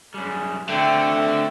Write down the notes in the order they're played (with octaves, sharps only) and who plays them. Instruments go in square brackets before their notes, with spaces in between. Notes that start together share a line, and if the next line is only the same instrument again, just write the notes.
[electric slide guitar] F#2 G3 [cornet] G#4
[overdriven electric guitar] D3 [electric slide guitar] A3 C4 F#4 [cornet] E5 [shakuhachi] G5